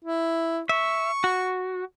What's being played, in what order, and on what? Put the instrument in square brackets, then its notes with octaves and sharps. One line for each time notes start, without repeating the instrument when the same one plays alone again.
[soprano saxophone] E4
[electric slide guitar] E5 [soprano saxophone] C#6
[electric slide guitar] F#4